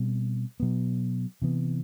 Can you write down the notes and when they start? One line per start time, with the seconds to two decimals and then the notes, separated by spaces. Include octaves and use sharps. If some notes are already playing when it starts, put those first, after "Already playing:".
Already playing: B2 G3 C4
0.60 B2 F#3 B3
1.42 C3 E3 B3